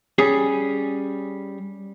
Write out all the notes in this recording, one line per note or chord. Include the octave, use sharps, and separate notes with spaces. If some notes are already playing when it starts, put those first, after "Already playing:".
G3 C#4 G#4